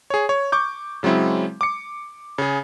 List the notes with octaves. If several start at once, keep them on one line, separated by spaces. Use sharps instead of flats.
G#4 C#5
C#5
C#6 D6 G6
C#3 F#3 G#3 C4 E4
D6 C#7
C#3 G#4